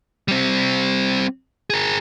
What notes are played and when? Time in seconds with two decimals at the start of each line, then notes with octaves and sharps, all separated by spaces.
0.28 G3 C4
1.70 G#4 A#4